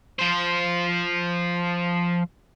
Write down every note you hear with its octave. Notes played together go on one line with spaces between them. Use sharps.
F3 C5